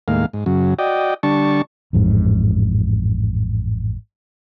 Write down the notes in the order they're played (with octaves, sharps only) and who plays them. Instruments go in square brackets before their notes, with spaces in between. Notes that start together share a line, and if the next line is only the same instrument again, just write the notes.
[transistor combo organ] D#2 A2 G#3 A#3 F5
G#2
F#2 C#3 F#3
F#4 D5 D#5 G5
D3 G3 D4 A5 C#6
[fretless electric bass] A1 F2 G#2